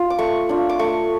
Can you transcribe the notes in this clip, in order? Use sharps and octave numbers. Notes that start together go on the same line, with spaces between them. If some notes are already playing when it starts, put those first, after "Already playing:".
Already playing: F4
D6
A3 C#6
D4 F4
D6
A3 C#6